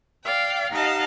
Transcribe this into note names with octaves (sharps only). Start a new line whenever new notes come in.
D5 F5 G5
D#4 G4 D#5 F5 F#5 A5